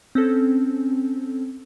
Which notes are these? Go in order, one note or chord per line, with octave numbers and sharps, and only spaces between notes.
C4 C#4 A4